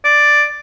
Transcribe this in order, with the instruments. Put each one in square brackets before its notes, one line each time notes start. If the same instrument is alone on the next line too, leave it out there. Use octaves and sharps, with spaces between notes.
[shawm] D5